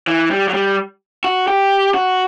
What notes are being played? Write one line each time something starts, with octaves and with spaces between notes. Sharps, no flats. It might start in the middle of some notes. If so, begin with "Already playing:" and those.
E3
G3
F#3
G3
F#4
G4
F#4